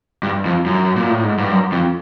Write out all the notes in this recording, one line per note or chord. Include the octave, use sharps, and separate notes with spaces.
G2
F2
F#2
A#2
A2
G#2
G2
F#2
F2